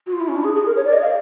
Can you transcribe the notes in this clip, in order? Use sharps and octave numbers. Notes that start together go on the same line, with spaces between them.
F#4
F4
E4
C#4
D4
G#4
G#4
A#4
C#5
D5
D#5
F5